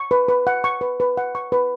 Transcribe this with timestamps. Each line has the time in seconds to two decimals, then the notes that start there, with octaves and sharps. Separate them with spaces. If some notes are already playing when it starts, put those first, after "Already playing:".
Already playing: C#6
0.11 B4
0.28 B4
0.47 F#5
0.64 C#6
0.81 B4
1.00 B4
1.17 F#5
1.35 C#6
1.52 B4